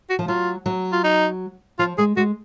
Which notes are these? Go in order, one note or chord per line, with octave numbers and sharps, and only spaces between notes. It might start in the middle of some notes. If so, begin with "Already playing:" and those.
F#4
F3
F#3 F4
F#3
F4
D#4
F3 F4
G#3 G#4
G#3 F#4